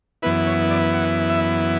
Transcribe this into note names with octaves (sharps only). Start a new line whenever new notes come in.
F#2 E3 B3 E4 B4
C#5
D5
F#5
E5